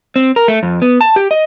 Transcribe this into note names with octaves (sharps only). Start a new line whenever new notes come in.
C4
A#4
A3
F2
B3
A5
G4
D#5